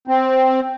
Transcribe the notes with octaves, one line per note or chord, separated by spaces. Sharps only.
C4